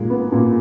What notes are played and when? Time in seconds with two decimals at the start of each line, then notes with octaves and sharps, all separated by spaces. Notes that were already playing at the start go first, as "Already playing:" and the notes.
Already playing: A#2 G#3
0.10 B3
0.32 A#2